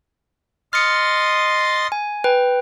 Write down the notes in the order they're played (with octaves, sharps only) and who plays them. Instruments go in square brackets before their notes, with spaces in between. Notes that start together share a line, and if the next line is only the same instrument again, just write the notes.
[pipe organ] D#5 C6 A6 [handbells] F6 C#7
[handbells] G#5
B4 G5